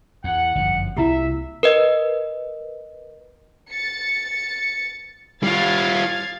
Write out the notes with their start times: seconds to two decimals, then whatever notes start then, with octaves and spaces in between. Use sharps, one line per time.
0.24 E2 F#5
0.55 G1 F#2 F3
0.97 C2 C3 A#3 E4 F4 G4 E5
1.63 A#4 B4 D#5
3.70 A6 C#7
5.43 G3 F4 F5 G#6 A6